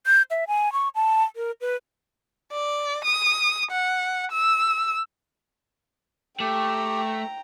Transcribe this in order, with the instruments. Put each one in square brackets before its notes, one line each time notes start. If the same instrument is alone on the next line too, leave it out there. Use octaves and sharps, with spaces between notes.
[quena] G6
E5
G#5
C#6
A5
A#4
B4
[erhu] D5
D#6
F#5
E6
[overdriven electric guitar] A3 [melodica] G4 [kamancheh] G5 A#5